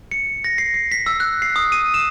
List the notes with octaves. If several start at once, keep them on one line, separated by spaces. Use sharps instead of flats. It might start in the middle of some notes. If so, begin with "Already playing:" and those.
C#7
A#6
C7
C7
B6
E6
F#6
C7
D#6
D#7
E7